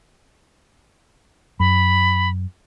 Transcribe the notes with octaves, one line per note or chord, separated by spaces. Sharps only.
F#2 B5